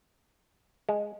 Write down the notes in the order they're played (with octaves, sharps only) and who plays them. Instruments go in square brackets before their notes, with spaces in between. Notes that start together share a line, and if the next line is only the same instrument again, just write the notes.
[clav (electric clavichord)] G#3